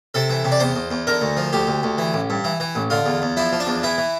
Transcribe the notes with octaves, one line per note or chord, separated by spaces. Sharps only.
C3 A4
E3
C3
D5
E2 C5
E2
E2
D3 A#4
D2
F3
D2 G4
D2
D2
E3
A1
G2
E3
E3
A1
D3 F4
E2
E2
F3 E4
F3
D4
E2
E3 E4
E3